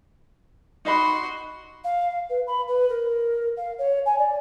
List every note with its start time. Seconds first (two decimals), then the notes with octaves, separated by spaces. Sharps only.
0.85 D#4 F#4 D#5 B5 C6
1.84 F5
2.29 B4
2.47 B5
2.68 B4
2.89 A#4
3.56 F5
3.78 C#5
4.05 G#5
4.18 D5